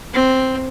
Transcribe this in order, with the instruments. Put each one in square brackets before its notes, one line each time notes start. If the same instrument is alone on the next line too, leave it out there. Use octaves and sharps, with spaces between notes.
[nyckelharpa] C4